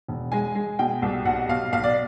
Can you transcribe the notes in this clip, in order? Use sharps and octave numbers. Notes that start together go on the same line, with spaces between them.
E1
G#3 G#5
G#3
B2 G5
C2
B1 F#5
B1 F5
B1 F5
D5